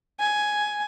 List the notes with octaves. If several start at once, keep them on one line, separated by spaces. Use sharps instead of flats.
G#5